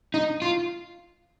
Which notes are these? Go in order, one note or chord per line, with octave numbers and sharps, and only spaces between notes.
D#4
F4